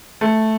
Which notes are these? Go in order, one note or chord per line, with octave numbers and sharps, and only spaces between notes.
A3